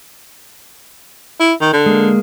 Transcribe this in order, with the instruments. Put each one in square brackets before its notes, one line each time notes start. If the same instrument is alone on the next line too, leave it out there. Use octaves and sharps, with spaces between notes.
[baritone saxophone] E4
D#3
D3
[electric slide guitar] G#3 A#3